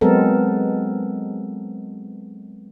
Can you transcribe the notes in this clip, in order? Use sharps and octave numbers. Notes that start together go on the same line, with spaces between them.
F#3 G#3 B3 C4 A4 A#4